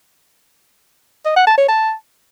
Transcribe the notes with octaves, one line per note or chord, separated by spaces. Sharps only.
D#5
F#5
A5
C#5
A5